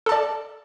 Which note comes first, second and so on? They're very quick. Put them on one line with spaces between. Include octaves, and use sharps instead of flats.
A4 A5 D5